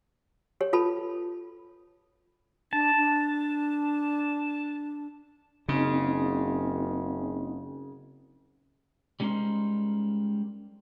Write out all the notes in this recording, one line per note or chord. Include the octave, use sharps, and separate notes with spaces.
G4 C#5
F4 A4 B4 A5 B5
D4 A5
D4
F#1 C#3 C4 D#4 D#5
G3 G#3 C#4 D#4 A#4 C5